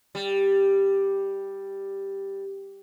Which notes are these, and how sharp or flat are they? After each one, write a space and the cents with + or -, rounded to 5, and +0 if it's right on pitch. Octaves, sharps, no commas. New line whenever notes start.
G3 +0